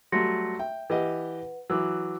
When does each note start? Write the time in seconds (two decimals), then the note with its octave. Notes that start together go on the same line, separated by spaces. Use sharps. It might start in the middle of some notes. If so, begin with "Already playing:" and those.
0.12 F#3 G3 A3 C6 A#6 C#7
0.59 E5 G5
0.90 E3 G4 B4 D#5 F#5
1.70 E3 F#3 D6 E6